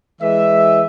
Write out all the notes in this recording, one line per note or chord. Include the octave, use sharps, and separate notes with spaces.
E3 G#3 E5